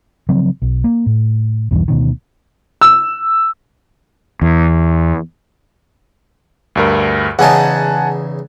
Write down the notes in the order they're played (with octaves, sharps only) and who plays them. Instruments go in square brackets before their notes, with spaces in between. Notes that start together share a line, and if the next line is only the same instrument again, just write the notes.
[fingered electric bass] C#3 F3 F#3 C4
B1
A#3
A2
B1 E2 G2 E3
D2 B2 D#3
[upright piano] E6
[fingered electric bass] E2
[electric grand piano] D2 G2 A#4
[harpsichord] E2 C#3 D#4 [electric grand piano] F#5 G#5 A5